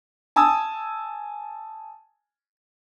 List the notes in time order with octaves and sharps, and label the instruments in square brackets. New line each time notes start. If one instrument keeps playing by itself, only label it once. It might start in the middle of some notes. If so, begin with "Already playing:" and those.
[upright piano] G#5 A5 D#6 E6